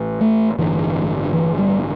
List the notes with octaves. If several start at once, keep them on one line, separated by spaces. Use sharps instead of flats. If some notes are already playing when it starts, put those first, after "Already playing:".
Already playing: A1 A2
A3
A1 G2 D3 E3
E3
G3